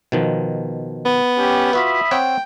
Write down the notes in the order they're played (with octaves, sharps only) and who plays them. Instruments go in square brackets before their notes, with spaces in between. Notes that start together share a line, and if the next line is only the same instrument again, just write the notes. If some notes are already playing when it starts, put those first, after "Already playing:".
[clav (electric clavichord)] B2 D#3 F3
[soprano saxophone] B3
[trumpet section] C#4 G4
[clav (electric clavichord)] F4 F#4 B4 [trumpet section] E5 B5 D#6
[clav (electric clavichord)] C4 C#5 F#5 [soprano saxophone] G5